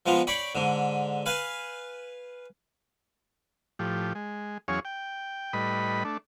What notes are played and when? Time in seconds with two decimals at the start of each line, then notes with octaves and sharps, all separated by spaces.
0.06 F3 G#3 B3 F4
0.27 C#5 D5 G5 B5
0.55 G#2 D3
1.26 B4 F5 G#5
3.79 A2 F3 G4
4.15 G#3
4.68 E2 F#3 C#4 G#4 C#5 F5
4.85 G5
5.53 A2 G3 B4 D#5 B5
6.05 A3 D4